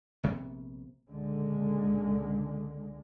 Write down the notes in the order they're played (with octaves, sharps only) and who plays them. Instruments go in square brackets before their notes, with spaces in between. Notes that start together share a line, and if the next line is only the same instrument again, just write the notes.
[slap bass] A#1 C3 B3
[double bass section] C#2 A#2 D3 G#3